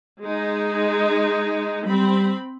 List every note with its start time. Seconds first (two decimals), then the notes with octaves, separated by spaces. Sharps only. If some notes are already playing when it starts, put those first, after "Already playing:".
0.23 G#3 D#4
1.86 G3 C4 B5